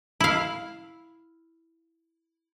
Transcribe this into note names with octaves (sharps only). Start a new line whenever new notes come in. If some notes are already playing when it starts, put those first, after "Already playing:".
E4 F5